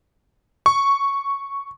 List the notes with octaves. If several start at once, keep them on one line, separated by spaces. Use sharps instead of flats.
C#6